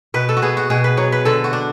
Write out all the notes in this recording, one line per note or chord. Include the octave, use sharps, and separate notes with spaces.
B2 B4
A4
F#4
B3 G#4
F#4
B2 G#4
B4
F#3 C#5
B4
D3 A4
F#4
D4